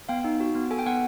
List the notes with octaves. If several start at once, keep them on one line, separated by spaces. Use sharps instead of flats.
B3 F5 G5
D#4
F#4
B3
A4 G#5
G5
B3 F#5 G#5